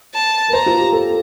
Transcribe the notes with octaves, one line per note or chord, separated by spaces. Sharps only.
A5
A#4
C5 A#5
F4
G4
A4